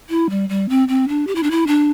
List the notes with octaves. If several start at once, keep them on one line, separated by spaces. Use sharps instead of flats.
E4
G3
G3
C4
C4
D4
G4
E4
D4
E4
D4